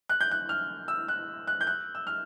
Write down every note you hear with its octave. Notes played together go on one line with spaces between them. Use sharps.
F#6
G6
F#6
F6
E6
F#6
F#6
G6
F#6
E6
F6